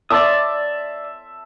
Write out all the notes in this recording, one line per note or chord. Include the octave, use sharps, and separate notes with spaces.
D5 E5 A5 C6 D6 D#6